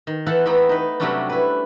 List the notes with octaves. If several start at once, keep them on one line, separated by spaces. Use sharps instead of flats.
D#3
E3 A4 C5 F5 F#5 A5
E2 A3 B3 C4 A#5 B5
D#4 B4
C3 F#3 G3 A3 C#4 D4
E4 B4